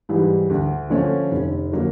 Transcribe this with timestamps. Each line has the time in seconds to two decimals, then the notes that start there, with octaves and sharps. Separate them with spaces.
0.09 G#2 E3 G3
0.50 D2
0.90 D3 F3 A3 C#4
1.31 F1
1.72 D3 F#3 A#3